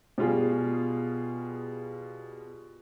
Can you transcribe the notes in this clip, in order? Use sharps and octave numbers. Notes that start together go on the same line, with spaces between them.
B2 G3 F4 G#4